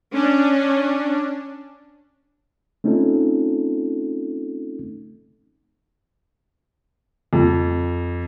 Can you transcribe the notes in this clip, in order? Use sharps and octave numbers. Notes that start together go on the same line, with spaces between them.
C#4 D4
A3 C4 C#4 D#4 F4 A4
F2